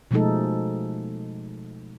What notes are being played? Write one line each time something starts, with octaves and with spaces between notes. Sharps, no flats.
B2 F3 G#3 A3 D#4 A4